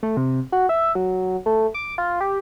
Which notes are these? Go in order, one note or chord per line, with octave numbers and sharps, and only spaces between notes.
A3
C3
F#4
E5
F#3
A3
D6
F4
G4